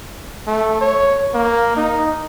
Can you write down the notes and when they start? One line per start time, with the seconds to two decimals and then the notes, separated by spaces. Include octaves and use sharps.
0.47 A3
0.81 C#5
1.34 A#3
1.77 D#4